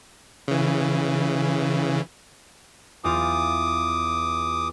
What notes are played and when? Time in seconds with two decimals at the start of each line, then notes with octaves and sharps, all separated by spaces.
0.48 C#3 E3
3.04 E2 F4 D6 D#6